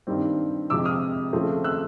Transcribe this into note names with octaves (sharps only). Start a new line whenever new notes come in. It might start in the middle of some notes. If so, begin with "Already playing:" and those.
G2 D#3 G3 C4
F2 C3 F3 G#3 D6 E6
D#6 F6
C#3 F3 A3 C4
E6 F#6